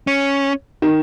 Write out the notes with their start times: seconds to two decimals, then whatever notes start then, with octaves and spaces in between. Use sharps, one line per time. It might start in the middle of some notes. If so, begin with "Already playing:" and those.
0.07 C#4
0.82 D#3